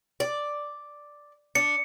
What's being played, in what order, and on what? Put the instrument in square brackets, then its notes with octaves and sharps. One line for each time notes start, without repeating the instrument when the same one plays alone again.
[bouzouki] D5
[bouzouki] D4 [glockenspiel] C#7